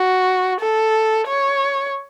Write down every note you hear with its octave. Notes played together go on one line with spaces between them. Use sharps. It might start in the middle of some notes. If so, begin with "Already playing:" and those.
Already playing: F#4
A4
C#5